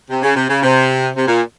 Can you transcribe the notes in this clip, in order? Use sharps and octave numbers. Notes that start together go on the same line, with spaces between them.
C3
C#3
C3
C#3
C3
C3
A#2